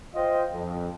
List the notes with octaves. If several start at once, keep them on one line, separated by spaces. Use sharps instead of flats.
F4 C5 D#5 G5
F2